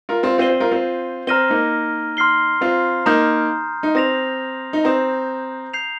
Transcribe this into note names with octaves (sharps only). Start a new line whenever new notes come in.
F4 A#4
C4 F4
C4 F4 G6 C7 D#7 G7
C4
F4 A#4
C4 F4
C4 A#5 F6 A#6 D#7 G7
A#3 D#4
C6 F6 C7 G7
C4 F4
A#3 D#4 A#5 D#6 G6
D#4
C4 D#6 A#6 F7
D#4
C4 A#5 D#6 G6
G6 C7 F7